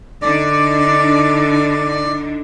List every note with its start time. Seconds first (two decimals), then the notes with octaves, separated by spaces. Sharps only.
0.22 D3 D4 D#4 D5